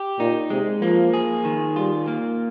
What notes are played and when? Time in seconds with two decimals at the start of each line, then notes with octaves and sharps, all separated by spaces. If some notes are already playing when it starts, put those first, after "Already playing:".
Already playing: G4
0.19 A#2 D#4
0.50 C3 G#3
0.82 F3 A#3
1.14 G#4
1.45 D#3
1.76 G3 F4
2.08 A#3